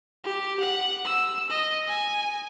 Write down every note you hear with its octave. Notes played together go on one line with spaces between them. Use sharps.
G4
F#5
E6
D#5
G#5